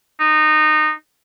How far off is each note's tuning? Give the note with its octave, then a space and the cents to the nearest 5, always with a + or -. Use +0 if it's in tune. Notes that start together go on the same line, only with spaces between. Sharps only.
D#4 -20